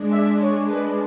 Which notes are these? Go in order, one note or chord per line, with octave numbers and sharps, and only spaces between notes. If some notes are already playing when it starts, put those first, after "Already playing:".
Already playing: G#3 D4
E5
C#5
B4